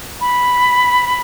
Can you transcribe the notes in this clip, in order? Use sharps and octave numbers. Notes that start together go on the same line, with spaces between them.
B5